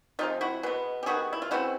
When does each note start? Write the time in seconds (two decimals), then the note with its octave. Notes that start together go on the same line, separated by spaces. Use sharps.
0.19 C3 F3 G#3 D#4 F4
0.41 E4 F#4
0.63 B2 G#3 B3
1.03 G4
1.06 D#3 G3 B3 F#4 G#4
1.33 E4
1.42 F4
1.51 C#3 E3 G#3 C4 E4 F#4